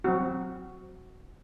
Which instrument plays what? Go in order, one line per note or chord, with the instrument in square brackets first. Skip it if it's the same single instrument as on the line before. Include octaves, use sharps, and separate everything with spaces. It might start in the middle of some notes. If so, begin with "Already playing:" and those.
[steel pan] F#3 C4 F#4